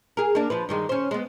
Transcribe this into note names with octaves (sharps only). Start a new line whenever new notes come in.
G#4 A#4
A#3 D4
F3 F4 B4
G2 D#3 G#3
C#4 C5
G#3 B3